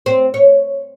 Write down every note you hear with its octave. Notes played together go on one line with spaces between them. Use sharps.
C4
C#5